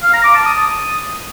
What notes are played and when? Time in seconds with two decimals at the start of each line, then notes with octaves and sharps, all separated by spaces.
0.03 F5
0.13 A#5
0.24 D6
0.35 A5
0.46 D#6